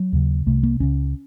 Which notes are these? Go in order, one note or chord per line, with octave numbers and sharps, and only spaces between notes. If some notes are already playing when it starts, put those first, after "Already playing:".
Already playing: F#3
D#2 C#3
C2 C3 A3
A#3
C#2 C#3 C#4